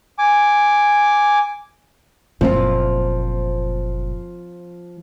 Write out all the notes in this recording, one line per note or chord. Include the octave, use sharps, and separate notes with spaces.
G#5 D6
F#1 A#2 F3 C4